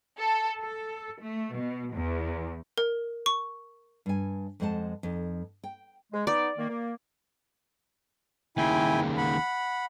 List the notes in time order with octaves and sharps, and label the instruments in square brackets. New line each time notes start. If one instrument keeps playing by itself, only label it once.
[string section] A4
A4
A3
B2
E2
[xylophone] A#4
C#6
[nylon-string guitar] G2 G#5
F2 G#3 C5 F#5 A5
F2 D#4
G5
[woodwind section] G#3
[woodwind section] B3 D#4 [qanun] D5
[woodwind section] D#3 A#3
A#3
[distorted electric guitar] D#2 C#3 [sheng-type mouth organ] E4 G5 G#5
[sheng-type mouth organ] F#5 B5